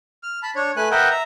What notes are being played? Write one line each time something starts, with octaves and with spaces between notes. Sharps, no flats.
F6
A5 B5
D4 C#5
A3 B4 G#5 F#6
A#4 B4 D#5 E5 F#5 G5
E5 A#5